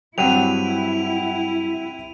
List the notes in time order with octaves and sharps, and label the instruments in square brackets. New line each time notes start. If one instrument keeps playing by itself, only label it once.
[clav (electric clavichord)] G2 F#3 [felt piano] C4 F#5 G5 [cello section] E4 [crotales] D#7 F7